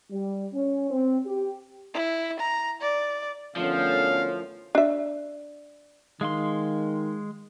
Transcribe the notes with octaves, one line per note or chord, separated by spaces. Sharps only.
G3
C#4
C4
G4
E4
A#5
D5
F#2 A2 D3 F3 B3 C#4 F5
D4 E5
D#3 G#3 F5 C6